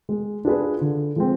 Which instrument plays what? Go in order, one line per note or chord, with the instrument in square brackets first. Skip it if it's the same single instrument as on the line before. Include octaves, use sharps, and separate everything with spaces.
[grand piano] G#3
D4 F4 G#4 B4
D3
F3 G#3 C4